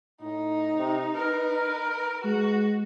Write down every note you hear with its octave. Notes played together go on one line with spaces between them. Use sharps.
A2 D#4
C3
A#4 B4
G#3 F#4